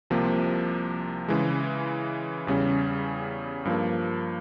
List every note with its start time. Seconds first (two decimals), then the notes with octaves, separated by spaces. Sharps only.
0.10 C2 C3 F3 A#3
1.28 C#3 E3 G#3
2.47 E2 C#3 G3 C#4
3.65 G2 F3 A#3